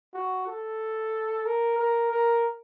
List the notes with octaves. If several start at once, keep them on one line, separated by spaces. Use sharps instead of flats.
F#4
A4
A#4
A#4
A#4